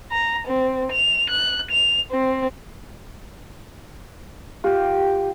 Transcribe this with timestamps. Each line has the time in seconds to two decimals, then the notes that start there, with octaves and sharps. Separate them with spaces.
0.12 A#5
0.48 C4
0.92 F7
1.31 F#6
1.71 F7
2.12 C4
4.64 F4 G4 G5